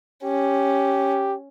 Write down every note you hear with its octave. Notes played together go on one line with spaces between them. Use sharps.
C#4 G4